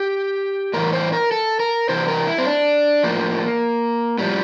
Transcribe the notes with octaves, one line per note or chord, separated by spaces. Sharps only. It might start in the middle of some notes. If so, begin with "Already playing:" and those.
Already playing: G4
A2 E3 A#4
C5
A#4
A4
A#4
C3 E3 C5
A#4
E4
C4
D4
A2 F3 A#3
A2 F3 G3